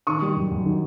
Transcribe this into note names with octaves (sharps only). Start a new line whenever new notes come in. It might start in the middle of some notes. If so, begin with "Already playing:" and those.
D#3 C#6 D#6
G3
F#2
F#2
D#3